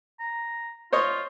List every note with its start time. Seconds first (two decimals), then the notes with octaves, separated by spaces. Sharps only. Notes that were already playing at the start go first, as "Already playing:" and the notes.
0.20 A#5
0.93 F4 C5 C#5 D#5